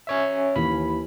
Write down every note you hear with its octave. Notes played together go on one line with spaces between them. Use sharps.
C#4 C#5 E5
D#2 E3 B5